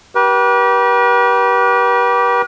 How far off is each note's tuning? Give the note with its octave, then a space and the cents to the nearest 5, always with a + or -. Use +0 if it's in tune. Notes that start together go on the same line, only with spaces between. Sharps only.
G4 -25 B4 -40